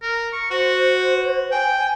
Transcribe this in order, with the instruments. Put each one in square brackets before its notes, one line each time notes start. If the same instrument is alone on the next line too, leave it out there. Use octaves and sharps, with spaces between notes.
[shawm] A#4
C#6
[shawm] F#4 [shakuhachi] C5
[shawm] G5 [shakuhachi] G#5